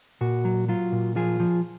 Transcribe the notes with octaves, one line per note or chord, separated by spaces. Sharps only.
A#2 F#4
F#3
F#3 F4
A#2
F3 F4 G#4
F3